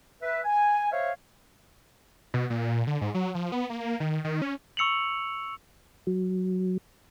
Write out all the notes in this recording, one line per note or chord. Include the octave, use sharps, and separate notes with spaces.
B4 E5
G#5
C5 C#5 E5 F5
B2
A#2
D3
G#2
F#3
F3
B3
A#3
D#3
D#3
C#4
C#6 E6 C#7 F7 F#7
F#3